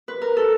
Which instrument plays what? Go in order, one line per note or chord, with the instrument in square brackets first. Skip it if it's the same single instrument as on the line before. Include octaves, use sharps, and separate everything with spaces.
[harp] B4
A#4
A4